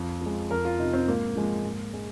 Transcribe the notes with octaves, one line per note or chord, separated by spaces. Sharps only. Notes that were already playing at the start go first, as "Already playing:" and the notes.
Already playing: F2
F3 G#3
F2 A#4
F4
C3 F3 D#4
C4
G#2 A#3
F3 G#3
G#2
G#3